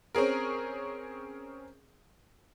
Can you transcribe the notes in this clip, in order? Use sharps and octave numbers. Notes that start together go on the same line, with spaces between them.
C4 C#4 G#4 A#4